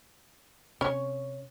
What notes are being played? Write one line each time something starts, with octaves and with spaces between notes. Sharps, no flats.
C3 C#4 C#5